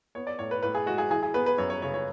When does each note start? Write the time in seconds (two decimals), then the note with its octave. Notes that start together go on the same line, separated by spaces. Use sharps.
0.15 B3 C#5
0.27 D5
0.39 A2 C#5
0.51 B4
0.62 A2 B4
0.75 G#4
0.86 G#3 F#4
0.98 G#4
1.11 E3 G#4
1.23 G#4
1.34 B3 B4
1.46 B4
1.58 F#2 C#5
1.70 C#5
1.82 C#3 C#5
1.94 C#5